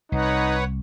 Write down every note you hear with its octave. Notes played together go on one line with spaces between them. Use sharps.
C2 D#4 B4 C#5 F#5